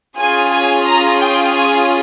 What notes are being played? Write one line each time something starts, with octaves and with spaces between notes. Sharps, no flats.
C#4 F4 G#4 G#5
G#5
A#5
G5
G#5